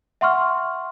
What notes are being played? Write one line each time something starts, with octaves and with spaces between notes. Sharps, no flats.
E5 F#5 C6 C#6 F6